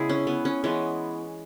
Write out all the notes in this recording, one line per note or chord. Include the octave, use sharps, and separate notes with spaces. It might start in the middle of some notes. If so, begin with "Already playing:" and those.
Already playing: C#3 G#3 B3 E4 G#4
C#4
B3
C#4
E3 G#3 B3 C#4